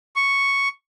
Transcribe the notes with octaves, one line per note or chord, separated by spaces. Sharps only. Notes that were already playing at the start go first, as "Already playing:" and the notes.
C#6